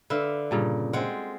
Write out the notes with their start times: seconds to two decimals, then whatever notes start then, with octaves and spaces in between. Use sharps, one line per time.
0.10 D3 B4 E5 F5
0.51 G2 A#2 C#3
0.93 G#3 C4 F4 F#5 G5